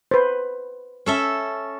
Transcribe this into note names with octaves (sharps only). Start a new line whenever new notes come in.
B4 C5
C#4 A4 E5